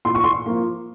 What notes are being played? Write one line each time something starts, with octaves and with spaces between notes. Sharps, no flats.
A#2 C6
C#6
C6
F3 A#3